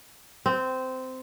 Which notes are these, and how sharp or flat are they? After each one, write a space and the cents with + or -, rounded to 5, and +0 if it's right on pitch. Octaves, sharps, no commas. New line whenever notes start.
C4 -15